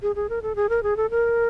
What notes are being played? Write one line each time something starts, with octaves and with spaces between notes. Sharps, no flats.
G#4
G#4
A#4
A4
G#4
A#4
G#4
A4
A#4